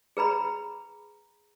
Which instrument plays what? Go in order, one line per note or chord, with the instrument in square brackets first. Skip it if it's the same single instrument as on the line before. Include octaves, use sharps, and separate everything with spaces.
[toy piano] G#4 B4 A#5 B5